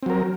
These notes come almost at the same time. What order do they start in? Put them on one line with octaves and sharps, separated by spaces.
C4 F#3 A#4